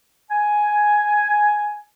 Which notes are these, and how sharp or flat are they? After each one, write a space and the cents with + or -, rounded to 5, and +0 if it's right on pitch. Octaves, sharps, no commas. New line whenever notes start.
G#5 +5